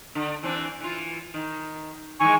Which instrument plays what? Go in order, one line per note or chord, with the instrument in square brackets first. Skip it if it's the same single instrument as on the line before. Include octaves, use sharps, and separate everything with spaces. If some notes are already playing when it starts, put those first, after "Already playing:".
[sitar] D3
E3 C4 D4
E3 F4
D#3
[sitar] D#3 E3 G#3 [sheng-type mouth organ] G#5 C#6